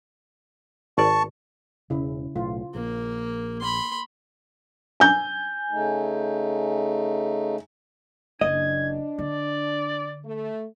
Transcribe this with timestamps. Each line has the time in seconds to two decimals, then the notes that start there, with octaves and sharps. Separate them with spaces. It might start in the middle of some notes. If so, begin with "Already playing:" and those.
0.98 G#1 D5 A5 C#6
1.90 E1 C#3 E4
2.36 B1 A2 F4
2.75 A#1 A#3
3.61 B5 C6
5.00 G#5 G6
5.71 C#3 A3 D#4
8.41 F#1 D4 D#5 G#6
9.19 D3 D5
10.25 A3